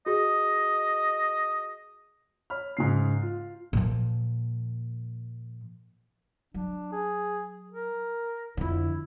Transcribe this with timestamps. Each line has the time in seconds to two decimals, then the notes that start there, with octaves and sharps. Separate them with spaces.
0.06 F#4 G#4 D#5
2.50 C#5 B5 F6
2.77 G#2 C#3 C7
3.22 F4
3.73 A#2 F3
6.54 F#3 D4
6.92 G#4
7.72 A#4
8.57 F2 D3 E4